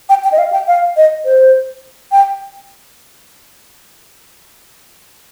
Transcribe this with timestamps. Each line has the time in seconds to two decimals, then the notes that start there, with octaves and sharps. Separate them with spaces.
0.09 G5
0.24 G5
0.32 D#5
0.38 F5
0.53 G5
0.67 F5
0.97 D#5
1.25 C5
2.12 G5